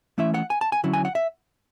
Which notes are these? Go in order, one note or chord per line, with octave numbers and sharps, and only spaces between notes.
E3 A3 C#4 E4 E5
F#5
G#5
A5
G#5
D3 F#3 C#4 E4
G#5
F#5
E5